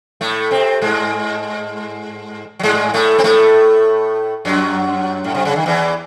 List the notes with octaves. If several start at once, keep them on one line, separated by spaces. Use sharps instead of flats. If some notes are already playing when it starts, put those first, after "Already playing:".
A2 A3
C3 C4
G#2 G#3
F#3
G#2 G#3
A2 A3
C4
A2 A3
F#2 F#3
A2
C3
C#3
D#3
E2 E3